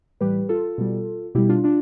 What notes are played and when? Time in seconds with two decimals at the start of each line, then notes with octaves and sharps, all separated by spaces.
0.21 A2 E3 G3 G4 B4
0.49 F4 A4
0.78 B2 G3
1.35 B2 G3 E4 G4
1.49 D4 F4
1.64 D4 F4